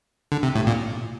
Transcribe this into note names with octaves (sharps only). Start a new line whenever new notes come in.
D3
C3
A2
A#2